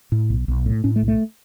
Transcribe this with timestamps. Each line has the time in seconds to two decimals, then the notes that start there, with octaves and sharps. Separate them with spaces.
0.12 A2
0.30 B1
0.48 B1
0.66 A2
0.84 A2 C#4
0.96 A3
1.02 B1
1.08 A3